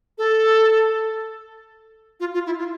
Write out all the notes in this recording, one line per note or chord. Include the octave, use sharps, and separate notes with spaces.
A4
F4
F4
E4
F4